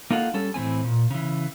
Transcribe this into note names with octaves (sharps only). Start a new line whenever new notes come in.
A#3 D#4 F4 A4 F#5
G3 C#4 A4
A2 E3 C4 G#5
A#2
C#3 E3